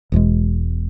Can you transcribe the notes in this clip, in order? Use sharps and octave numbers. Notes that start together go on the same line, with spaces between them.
E1 E2 B2 G#3